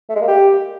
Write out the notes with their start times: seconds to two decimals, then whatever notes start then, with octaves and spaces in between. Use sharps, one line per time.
0.09 A3
0.15 G#3
0.22 A#3
0.28 G4